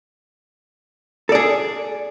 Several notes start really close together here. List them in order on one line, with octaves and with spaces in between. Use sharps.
A4 D5 G#4